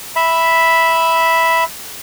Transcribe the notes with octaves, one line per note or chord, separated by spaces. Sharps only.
E5 B5